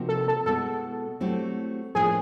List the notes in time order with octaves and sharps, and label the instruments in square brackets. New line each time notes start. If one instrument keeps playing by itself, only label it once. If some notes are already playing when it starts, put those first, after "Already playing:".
Already playing: [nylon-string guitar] C3 F3 A#3 D#4 F#4
[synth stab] A4
A4
[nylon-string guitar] B2 G#3 B3 E4 [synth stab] A4
[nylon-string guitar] F#3 A3 C4 E4 G4
[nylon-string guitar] A2 F3 A#3 D4 [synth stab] G#4